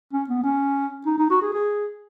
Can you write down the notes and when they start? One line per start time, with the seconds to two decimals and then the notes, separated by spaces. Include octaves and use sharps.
0.13 C#4
0.29 B3
0.44 C#4
1.06 D#4
1.18 D#4
1.30 F#4
1.42 G#4
1.53 G#4